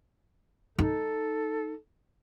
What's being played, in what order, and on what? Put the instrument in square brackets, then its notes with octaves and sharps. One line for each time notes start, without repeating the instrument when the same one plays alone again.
[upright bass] D#4 [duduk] A4